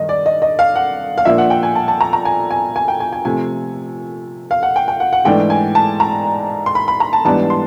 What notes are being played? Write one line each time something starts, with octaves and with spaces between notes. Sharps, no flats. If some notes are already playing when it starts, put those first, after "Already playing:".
Already playing: G2 D#3 D#5
D5
D#5
D#5
F5
F#5
F5
A#2 F3 A#3 D4 E5
F#5
G5
G#5
A5
A5
A#5
A#5
G#5
G#5
G#5
G5
G#5
G#5
C3 F3 A3 G#5
F5
F#5
G5
G5
F#5
F#5
G#2 E3 A3 D4 G5
G#5
A5
A#5
C6
B5
B5
A#5
A5
G#2 E3 G3 B3 D4 A5
C6